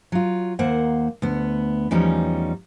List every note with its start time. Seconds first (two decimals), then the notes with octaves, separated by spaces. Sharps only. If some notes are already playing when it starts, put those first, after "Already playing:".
0.12 F#3 F4
0.59 D#2 A#3 C5 F#5
1.22 D2 B3
1.91 E2 F3 G3 C#4 D#4